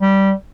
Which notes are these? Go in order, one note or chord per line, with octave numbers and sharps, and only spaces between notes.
G3